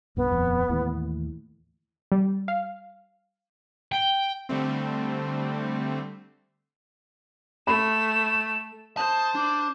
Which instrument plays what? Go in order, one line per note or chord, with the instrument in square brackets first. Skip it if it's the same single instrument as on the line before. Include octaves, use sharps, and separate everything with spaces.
[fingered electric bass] C2 G2 [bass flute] B3
[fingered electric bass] D#1 F2
D#2 A2 E3
[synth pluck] G3
F5
[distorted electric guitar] G5
[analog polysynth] D3 G3 A3 C4
[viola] A3 [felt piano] B5 [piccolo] E7
[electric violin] C5 [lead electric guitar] A5 [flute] D#6
[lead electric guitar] D4 [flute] D6